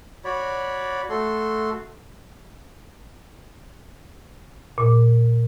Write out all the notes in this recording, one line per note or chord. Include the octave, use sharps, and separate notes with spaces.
F#4 C#5 D5 B5
A3 F#4 A4 C6
A#2